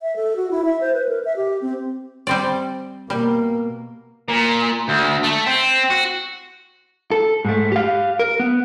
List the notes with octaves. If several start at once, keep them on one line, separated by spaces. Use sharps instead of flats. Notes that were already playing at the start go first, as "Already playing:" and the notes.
E5
A4
F#4
E4
E5
C5
B4
A#4
E5
G4
C4
G3 C4 D5
B2 G3 A#3
A#2
D2
A3
C4
F#4
A4
G#2 A3
G4 F5
A#4
B3